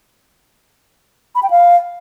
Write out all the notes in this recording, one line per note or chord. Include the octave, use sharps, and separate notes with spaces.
B5
G5
F5